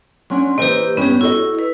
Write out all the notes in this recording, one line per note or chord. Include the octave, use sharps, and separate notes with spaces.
F#3 C#4 D4 C6
E3 A#3 E4 G4 C5 D#5
G2 B3 C#4 D4 G4
E4 F#4 A4 D#5
B4 E6